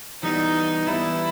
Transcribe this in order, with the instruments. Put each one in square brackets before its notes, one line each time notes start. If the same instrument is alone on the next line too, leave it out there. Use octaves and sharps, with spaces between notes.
[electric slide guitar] E3 G3 B3 [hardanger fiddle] D#4
[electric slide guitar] E3 G3 B3 [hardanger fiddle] E4